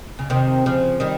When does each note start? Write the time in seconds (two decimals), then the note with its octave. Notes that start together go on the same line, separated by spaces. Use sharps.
0.19 C#3
0.30 C3 D#3
0.66 C#3 F3
1.00 D#3 G3